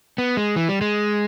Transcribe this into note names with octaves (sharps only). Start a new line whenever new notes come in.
B3
G#3
E3
G3
G#3